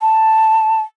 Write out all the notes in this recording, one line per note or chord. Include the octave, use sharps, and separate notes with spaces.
A5